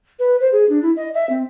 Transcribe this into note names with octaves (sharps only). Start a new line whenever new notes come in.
B4
C5
G#4
D4
E4
D#5
E5
C4